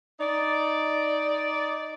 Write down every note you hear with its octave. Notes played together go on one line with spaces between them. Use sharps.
D#4 D5